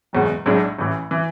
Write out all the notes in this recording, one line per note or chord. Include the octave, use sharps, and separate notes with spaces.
F#1 E2 B2 G#3
B1 A2 G#3 D4
A1 A2 E3
E3